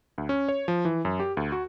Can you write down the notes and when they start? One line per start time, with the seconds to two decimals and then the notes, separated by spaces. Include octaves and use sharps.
0.18 D2
0.29 C#4
0.49 C#5
0.68 F3
0.85 E3
1.05 F#2
1.20 G4
1.37 D2
1.52 F#4